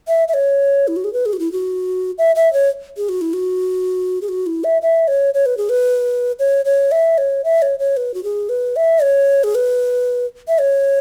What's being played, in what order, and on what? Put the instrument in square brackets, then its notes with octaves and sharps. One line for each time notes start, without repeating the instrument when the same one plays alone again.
[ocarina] E5
E5
C#5
E4
F#4
G#4
B4
G#4
F#4
E4
F#4
E5
E5
C#5
G#4
F#4
E4
F#4
G#4
F#4
E4
E5
E5
C#5
C#5
B4
G#4
B4
C#5
C#5
E5
C#5
E5
C#5
C#5
B4
F#4
G#4
B4
E5
C#5
G#4
B4
E5
C#5